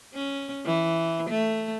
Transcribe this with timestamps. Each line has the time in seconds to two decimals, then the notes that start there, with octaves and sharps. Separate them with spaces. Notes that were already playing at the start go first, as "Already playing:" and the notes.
0.15 C#4
0.65 E3
1.30 A3